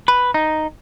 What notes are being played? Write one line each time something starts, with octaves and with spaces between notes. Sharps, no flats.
B4
D#4